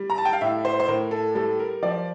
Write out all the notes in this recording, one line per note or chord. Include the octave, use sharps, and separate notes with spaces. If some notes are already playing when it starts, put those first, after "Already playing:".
Already playing: G3
A#5
A5
G5
F5
A2 E5
C5
C5
A2 A#4
A4
G3 A4
A#4
F3 D5